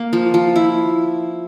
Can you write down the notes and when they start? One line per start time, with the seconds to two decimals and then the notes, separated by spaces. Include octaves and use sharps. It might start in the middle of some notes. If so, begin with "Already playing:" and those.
Already playing: A#3
0.13 F3
0.34 F3
0.56 E4